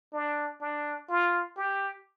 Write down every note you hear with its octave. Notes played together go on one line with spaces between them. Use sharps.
D4
D4
F4
G4